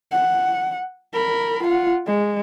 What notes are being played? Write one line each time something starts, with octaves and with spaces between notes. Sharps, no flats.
F#5
A#4 B5
F4 F#5
G#3